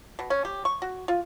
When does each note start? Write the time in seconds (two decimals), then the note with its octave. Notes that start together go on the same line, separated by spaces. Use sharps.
0.19 B2
0.30 C#4
0.45 G4
0.65 C#6
0.82 F#4
1.08 F4